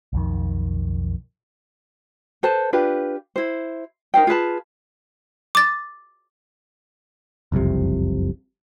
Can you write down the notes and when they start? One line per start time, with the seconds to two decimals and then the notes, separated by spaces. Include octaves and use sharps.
0.13 B1 F2 D#3
2.43 A4 B4 C5 A5
2.73 D4 F4 G4 B4
3.36 E4 C5
4.14 D#4 A#4 C5 G5
4.27 F4 G#4 B4 A5
5.55 D6 A6
7.52 F#1 C2 F2 C3